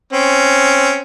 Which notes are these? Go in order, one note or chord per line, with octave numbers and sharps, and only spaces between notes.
C4 C#4